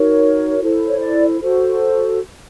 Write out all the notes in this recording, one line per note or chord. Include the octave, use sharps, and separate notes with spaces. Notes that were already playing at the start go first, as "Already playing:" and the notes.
Already playing: D#4 F#4 A#4 C#5
E4 A4 C5
C#5
D5
F#4 A4 C5